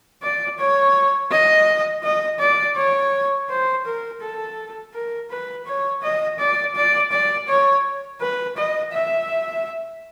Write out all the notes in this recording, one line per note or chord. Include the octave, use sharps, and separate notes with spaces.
D5
C#5
D#5
D#5
D5
C#5
C5
A#4
A4
A#4
B4
C#5
D#5
D5
D5
D5
C#5
B4
D#5
E5